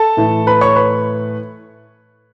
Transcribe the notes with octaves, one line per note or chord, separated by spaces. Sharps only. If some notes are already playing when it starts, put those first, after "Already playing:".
Already playing: A4 A5
A2 E3 A3
B4 B5
C#5 C#6
B4 B5